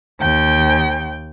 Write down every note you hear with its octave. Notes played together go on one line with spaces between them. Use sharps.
D#2 G5